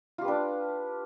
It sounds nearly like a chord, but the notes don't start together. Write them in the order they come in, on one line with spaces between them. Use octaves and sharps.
F4 G4 B4 D4